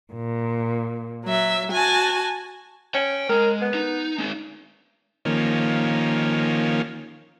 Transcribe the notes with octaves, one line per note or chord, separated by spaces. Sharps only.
A#2
F#3 E5
F#4 G#5 A5
C#4 G5
G#3 A#4
B3
D#4
G#3 C4
D#3 F3 A#3 C#4